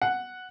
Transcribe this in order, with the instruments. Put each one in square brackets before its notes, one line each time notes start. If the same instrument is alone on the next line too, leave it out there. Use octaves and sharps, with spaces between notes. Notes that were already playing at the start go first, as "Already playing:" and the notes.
[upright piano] F#5